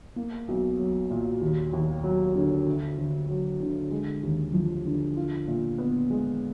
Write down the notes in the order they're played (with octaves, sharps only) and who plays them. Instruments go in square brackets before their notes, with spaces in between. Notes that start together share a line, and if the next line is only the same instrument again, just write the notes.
[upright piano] A#3
B1
F#3
A#2
D#2
D#2
F#3
D3
D2
D2
F#3
D3
G#3
D#2
F3
D3
F4
A#2
B3
G#3